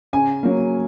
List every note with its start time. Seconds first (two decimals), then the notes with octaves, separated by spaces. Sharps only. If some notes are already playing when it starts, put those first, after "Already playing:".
0.13 C#3 G#5
0.43 F#3 A#3